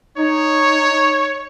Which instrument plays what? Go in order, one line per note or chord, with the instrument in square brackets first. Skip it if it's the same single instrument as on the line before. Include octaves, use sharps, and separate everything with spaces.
[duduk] D#4 [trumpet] C#5